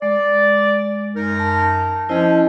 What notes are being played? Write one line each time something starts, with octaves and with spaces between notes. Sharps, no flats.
G#3 D5
F#2 D#4 A#4
A5
F3 C#4 E4 C5 D#5